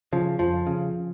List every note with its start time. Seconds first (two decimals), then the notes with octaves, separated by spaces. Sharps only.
0.13 C#3 F3
0.39 F2 F3
0.67 C#3